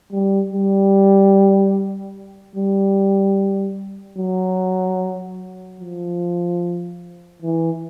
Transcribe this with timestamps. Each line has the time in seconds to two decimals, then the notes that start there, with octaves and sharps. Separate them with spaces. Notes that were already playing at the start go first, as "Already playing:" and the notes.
0.12 G3
0.53 G3
2.56 G3
4.18 F#3
5.80 F3
7.42 E3